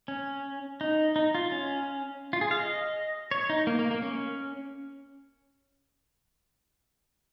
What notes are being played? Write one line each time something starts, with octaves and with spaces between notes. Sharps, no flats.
C#4
D#4
D#4
F4
C#4
F4
G#4
F5
D#5
C#5
D#4
A#3
A#3
A#3
C#4